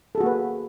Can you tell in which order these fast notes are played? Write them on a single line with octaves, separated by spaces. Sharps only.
A4 G#4 F#4 A#3 B4